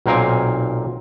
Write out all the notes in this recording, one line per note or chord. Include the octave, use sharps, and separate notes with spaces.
B1 A#2 C4 A#4 F5 G#5